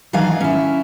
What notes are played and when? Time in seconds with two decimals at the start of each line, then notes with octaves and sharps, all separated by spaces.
0.13 D#3 E3 F#3 D4 F5 G#5
0.41 C#4 E4